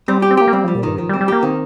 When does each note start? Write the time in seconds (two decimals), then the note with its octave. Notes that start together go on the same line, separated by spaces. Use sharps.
0.08 G3 C4
0.22 G4
0.31 C4
0.37 A#3 G4
0.48 A#3
0.53 G3 C4
0.64 F3 G3
0.75 A#2
0.83 G2 D#3
0.98 D#3 F3
1.09 G3
1.13 C4
1.21 G3
1.28 A#3 G4
1.43 D#3 C4